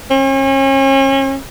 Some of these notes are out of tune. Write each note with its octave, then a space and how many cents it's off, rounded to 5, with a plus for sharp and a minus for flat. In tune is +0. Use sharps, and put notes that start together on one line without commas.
C#4 -40